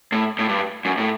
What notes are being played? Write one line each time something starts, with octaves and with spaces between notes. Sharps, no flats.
A2
A2
G2
F#2
A2